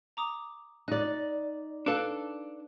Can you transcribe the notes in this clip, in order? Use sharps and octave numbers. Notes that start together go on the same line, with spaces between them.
A#5 D6 D#6
D#4 D5 F#6
D4 A4 B4 F5 F#6